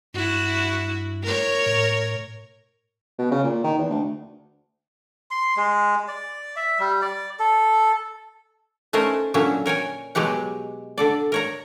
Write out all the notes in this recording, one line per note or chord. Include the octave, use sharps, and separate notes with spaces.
G2 E4 F#4
A#4 C#5
A2
B2
C#3
A#2
D#3
E2
D2
C6
G#3
D5
E5
G3
D5
A4
A3 C#4 D#4 A#4 C5
A#2 D3 F#3 C#4 E5
A#4 C#5 G5 G#5
B2 F#3 G#3 G4 F#5
D3 A4 D5
A#4 C#5 A#5